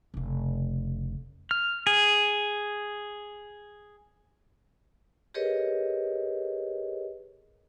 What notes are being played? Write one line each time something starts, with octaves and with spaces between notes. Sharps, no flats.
F1 C#3
F6
G#4
G4 G#4 A#4 B4 C#5 D#5